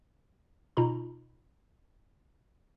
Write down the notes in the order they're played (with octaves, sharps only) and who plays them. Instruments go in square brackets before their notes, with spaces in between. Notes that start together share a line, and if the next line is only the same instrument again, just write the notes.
[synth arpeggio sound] B2 D#4 F4 A#5 B5